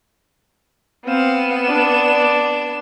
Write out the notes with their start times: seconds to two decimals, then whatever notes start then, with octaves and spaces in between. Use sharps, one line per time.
1.05 B3 C4 F5 E7
1.66 D4 D5